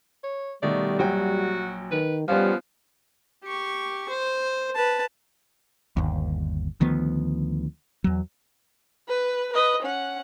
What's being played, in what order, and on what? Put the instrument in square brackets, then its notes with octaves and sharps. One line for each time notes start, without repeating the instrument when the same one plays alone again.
[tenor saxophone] C#5
[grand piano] B2 D#3 A3 [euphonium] G3 [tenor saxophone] D5
[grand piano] A#1 F#3 G5 [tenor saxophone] F#4
[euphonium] D#3 [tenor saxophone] B4
[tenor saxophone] F3 [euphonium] G3 [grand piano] B3 C#4 F4
[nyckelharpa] G4 C#6
C5
B4 A5
[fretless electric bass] G1 D#2
D2 D#3 F3 B3
E2 F#3
[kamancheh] B4
B4 D#5
C#4 F#5